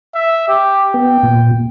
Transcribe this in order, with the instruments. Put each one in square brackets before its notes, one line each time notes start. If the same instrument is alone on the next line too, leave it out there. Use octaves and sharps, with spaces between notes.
[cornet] E5
G4
[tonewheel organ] B3 [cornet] G5
[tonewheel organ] A#2